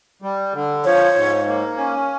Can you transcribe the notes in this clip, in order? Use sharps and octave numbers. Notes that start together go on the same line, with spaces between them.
G3
D3
F3 C#5
G#2
A#3
C#4